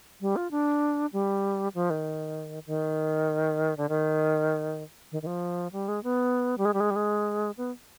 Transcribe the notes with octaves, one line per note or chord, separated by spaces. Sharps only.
G3
F4
D4
G3
F3
D#3
D#3
D3
D#3
D#3
D#3
F3
G3
G#3
B3
G3
G#3
G3
G#3
G3
G#3
B3